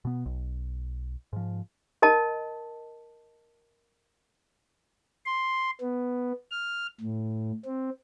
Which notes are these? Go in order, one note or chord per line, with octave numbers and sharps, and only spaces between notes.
B2 B3
B1
G#2 F3
A#4 D#5 A5
C6
B3
F6
A2
C4